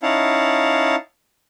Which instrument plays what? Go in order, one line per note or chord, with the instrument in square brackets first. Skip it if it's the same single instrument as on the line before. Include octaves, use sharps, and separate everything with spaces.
[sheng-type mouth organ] C#4 D#4 E4 F5 F#5 A5